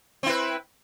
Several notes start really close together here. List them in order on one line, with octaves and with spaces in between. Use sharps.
C4 E4 B4